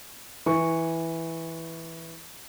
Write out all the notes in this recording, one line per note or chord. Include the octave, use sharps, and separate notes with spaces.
E3 C#6